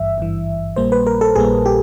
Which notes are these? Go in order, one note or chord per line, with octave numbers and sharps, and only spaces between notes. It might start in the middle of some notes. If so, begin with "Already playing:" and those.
Already playing: G#1 G2 E3 E5
G#1 G2 E3
A#1 A#2 G3 A#3 C5
B4
A#4
A4
A#1 A#2 G3 A#3 G#4
G4